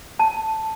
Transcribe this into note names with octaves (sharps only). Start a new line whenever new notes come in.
A5